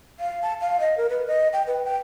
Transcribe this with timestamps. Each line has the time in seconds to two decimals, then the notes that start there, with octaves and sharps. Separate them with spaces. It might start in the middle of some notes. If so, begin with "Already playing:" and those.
0.20 F5
0.42 A5
0.61 F5
0.80 D#5
0.97 A#4
1.09 B4
1.27 D#5
1.53 G5
1.67 B4
1.85 G5